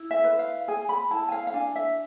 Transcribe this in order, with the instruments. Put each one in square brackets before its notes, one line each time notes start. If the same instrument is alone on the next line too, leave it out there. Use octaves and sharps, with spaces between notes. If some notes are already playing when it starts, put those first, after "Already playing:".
Already playing: [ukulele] E4
E5
B4
F5
G#4 G#5
B5
E4 A5
G#5
F5
F5
D4 G#5
E5